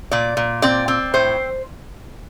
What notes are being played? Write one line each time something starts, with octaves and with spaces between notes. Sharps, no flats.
A#2 D5
A#2
C4 D5
C4
A2 C5